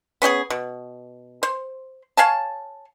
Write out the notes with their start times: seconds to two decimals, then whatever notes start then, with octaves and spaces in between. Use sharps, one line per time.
0.22 B3 C#4 G4 G#4
0.50 B2
1.43 C5
2.17 C#5 F5 G#5 A5